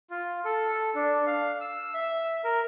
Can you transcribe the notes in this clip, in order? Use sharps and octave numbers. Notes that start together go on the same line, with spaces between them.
F4
A4
D4
F5
E6
E5
A#4